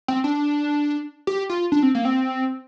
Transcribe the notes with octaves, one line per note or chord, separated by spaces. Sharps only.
C4
D4
G4
F4
D4
C4
A#3
C4